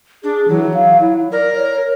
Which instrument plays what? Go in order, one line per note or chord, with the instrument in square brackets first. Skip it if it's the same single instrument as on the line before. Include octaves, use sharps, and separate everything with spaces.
[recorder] D4 [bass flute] G#4
[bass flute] E3 [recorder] F#3
[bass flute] F5
E4
[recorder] A#4 [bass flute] D5
[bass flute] C#5